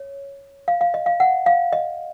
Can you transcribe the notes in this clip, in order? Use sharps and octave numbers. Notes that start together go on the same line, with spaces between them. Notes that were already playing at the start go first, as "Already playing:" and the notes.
Already playing: C#5
F5
F5
D#5
F5
F#5
F5
D#5